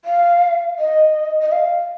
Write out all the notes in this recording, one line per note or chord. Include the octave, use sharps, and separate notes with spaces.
F5
D#5
D#5
F5